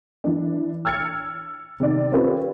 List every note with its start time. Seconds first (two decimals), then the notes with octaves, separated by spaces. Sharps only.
0.24 E3 D4
0.85 E6 F6 G#6 A6 C#7
1.80 C3 D#3 D5
2.12 C4 C#4 F4 G4 B4